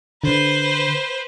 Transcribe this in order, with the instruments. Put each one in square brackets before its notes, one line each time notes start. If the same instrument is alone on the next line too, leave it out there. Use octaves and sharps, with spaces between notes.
[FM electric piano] D3 [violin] B4 C5